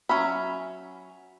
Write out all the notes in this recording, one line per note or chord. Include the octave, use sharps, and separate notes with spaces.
F#3 C#4 E5 B5